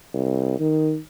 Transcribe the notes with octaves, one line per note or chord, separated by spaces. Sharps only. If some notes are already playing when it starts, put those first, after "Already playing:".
C2
D#3